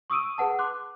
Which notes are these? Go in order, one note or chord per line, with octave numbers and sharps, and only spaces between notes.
C#6 D#6 E6 D7 D#7
G#4 B4 F#5 A5
C6 D6 F#6